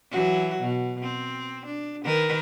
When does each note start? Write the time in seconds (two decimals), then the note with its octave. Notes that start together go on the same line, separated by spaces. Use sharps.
0.11 E3 F#3 F#4
0.61 B2
1.02 C4
1.66 D4
2.04 D#3 A#4 B4